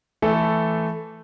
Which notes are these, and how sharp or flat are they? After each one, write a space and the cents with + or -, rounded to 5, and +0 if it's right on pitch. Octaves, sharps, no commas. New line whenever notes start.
E3 +0 A3 +0 A4 -5